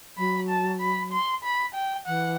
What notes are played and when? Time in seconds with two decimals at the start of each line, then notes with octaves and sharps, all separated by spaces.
0.17 F#3 B5
0.49 A5
0.81 B5
1.12 C6
1.44 B5
1.75 G5
2.06 E3 F#5